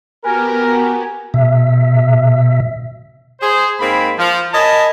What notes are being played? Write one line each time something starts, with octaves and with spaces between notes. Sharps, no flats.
B3 F#4 G4 A#4 G#5
B2 E5
G#4 C5
G#2 A#3 C4 G#4 B5
F3
A#4 C#5 D#5 G#5 A5 B5